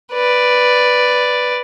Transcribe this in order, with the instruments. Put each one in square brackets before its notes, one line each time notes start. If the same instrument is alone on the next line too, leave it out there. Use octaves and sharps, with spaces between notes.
[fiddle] B4 D5